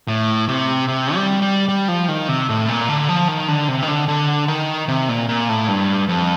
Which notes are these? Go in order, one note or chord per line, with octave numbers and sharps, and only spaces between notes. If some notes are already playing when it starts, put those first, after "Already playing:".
A2
C3
C3
G3
G3
G3
F3
D#3
C3
A2
A#2
D3
F3
D#3
D3
C3
D#3
D3
D3
D#3
C3
A#2
A#2
A2
G2
F2